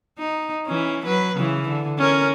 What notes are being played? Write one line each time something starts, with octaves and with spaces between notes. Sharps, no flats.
D#4
E3 C#4
F#3 B4
C#3 E3
D3
C#4 A#4